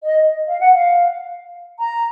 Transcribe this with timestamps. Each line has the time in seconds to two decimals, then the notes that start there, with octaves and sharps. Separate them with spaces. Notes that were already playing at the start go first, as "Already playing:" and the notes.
0.02 D#5
0.47 F5
0.59 F#5
0.72 F5
1.79 A#5